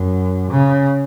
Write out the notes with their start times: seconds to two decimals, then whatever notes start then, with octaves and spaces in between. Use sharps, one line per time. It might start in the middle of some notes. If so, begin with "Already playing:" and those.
Already playing: F#2
0.51 C#3